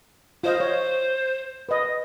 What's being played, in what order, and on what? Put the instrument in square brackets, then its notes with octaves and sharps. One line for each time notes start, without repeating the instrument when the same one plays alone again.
[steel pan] F4 D#5 F5 [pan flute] C5
[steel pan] C#5
B4 D#5